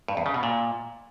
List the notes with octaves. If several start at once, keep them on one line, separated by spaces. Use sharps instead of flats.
G2
E2
C#3
B2
A#2